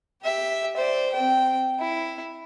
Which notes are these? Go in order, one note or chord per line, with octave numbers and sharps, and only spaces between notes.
G4 E5
C5 D5
C4 G5
E4